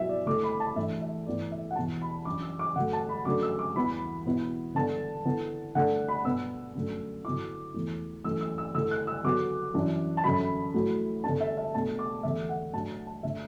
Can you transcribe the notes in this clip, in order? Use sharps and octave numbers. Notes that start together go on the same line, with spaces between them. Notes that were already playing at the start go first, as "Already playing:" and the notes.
Already playing: B2 F#3 B3 E4 E5 E6
D5
D3 A3 E4 D6
B5
A5
A2 E3 D4 E5
E5
A2 E3 B3 E4 D5
E5
F#5
E2 B2 B3 E4 A5
B5
F#2 E3 D4 D6
E6
D6
D3 F#3 A3 F#5
A5
B5
F#2 D3 F#3 A3 D4 D6
E6
D6
E2 E3 B3 E4 B5
B2 B3 E4
D3 B3 D4 A5
D3 B3 E4
D3 A3 D4 F#5
B5
B2 B3 D4 E6
F#2 D3 A3 D4
D3 F#3 B3 E4 D6
E2 E3 A3 E4
F#2 E3 A3 E6
E6
E6
D3 A3 E4 E6
F#6
E6
D3 F#3 B3 D6
F#2 E3 D4
A5
F#2 D3 F#3 B5
A2 F#3 A3 E4
D3 B3 D4 A5
E5
E5
B2 A3 D4 A5
D6
E2 D3 A3 E5
F#5
A2 F#3 D4 A5
A5
D3 A3 D4 E5